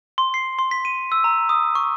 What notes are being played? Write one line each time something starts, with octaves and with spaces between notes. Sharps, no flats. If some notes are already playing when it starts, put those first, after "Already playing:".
C6
C7
C6
B6
D#7
E6
A#5
D#6
C#6